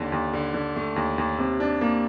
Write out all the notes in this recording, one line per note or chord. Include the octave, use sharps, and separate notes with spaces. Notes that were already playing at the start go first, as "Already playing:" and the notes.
Already playing: D#2 D3
D#2
D3
D3
A3
D#2
D#2
C3
D4
A#3